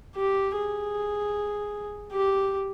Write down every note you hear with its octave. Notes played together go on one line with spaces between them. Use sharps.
G4
G#4
G4